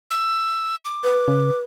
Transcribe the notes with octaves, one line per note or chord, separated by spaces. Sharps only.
E6
D6
B4
C#3